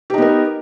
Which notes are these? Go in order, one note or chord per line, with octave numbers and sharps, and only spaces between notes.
B3 D#4 G4 A#4